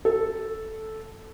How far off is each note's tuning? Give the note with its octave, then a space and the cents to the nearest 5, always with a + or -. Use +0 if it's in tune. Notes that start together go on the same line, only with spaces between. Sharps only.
A4 -5